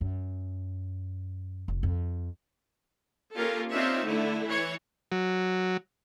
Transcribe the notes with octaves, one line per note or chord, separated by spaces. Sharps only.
F#2
F1
F2
A#3 C#4 F4 G4 A4 A#4
C4 D4 D#4 F4 C#5 E5
D3 A3 E4
E3 C#5
F#3